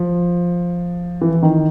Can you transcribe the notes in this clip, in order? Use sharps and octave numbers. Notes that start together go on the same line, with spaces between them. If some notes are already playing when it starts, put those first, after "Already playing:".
Already playing: F3
E3
D#3